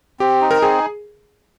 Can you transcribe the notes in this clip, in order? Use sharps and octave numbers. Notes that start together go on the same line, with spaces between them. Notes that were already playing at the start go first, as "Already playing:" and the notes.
C4 G4
D#4
A#4
C4 G#4